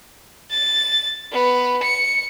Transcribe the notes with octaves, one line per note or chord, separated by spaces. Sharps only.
A6
B3
C#7